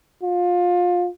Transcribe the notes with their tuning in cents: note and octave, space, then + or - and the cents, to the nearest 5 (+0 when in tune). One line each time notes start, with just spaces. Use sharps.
F4 +25